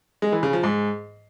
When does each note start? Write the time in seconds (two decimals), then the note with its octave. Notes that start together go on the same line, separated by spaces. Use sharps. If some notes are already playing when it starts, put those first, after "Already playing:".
0.22 G#3
0.32 E3
0.43 C#3
0.53 F3
0.63 G#2